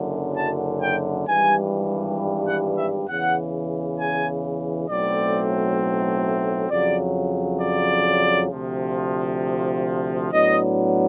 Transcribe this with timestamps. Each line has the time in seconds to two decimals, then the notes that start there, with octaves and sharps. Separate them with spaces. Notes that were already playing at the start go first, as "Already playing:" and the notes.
Already playing: F#1 F#2 D3
0.37 A5
0.82 G5
1.28 G#1 G2 E3 G3 G#5
2.48 F#5
2.78 E5
3.09 E2 C#3 E3 F#5
3.99 G#5
4.89 B1 A2 F#3 A3 C4 D5
6.70 F2 C#3 F#3 D5
7.61 D5
8.51 D2 C3 F3
10.32 A2 F#3 B3 D4 D#5